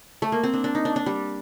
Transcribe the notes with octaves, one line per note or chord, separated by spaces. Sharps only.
A3
A#3
C4
D4
D4
D#4
D4
D4
G3